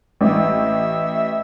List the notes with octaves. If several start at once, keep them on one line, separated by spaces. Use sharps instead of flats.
A1 E5